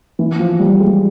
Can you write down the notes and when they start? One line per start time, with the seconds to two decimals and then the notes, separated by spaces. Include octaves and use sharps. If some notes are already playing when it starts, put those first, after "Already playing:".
0.19 E3
0.39 F3
0.59 G3
0.80 G#3